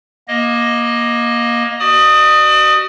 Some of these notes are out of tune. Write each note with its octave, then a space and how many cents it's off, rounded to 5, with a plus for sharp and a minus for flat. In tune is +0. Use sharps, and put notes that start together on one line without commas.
A#3 +20 D#5 +0
F#4 +35 D5 +40 D#6 +0